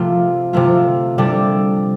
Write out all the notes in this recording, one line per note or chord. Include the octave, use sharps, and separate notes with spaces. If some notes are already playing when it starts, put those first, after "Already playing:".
Already playing: C3 F3 A3 F4
C3 F3 A3 F4
C3 G3 D4 A4